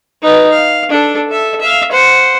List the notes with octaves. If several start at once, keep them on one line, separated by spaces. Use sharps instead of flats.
D#4 B4
F5
D4 A4
A4 E5
E5 F5
C5 F#5